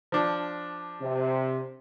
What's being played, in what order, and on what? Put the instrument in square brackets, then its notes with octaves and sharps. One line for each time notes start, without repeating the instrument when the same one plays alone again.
[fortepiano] F3 D4
[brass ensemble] C3